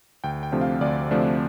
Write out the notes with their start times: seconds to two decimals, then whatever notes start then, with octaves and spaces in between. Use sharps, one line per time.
0.24 D2 G5
0.43 G5
0.52 C3 F3 A3 D4
0.61 F5
0.81 D2 D5
1.11 C3 F3 A3 D4 C5